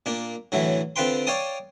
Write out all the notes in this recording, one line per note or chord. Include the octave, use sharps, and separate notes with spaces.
A#2 A#3 D4
A2 D3 E3 F#3
D3 C4 F4 B4 G5 C6
C#5 D5 F5 G5 A5 D#6